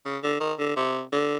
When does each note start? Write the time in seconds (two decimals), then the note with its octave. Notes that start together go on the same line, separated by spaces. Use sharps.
0.05 C#3
0.23 D3
0.40 D#3
0.59 D3
0.76 C3
1.13 D3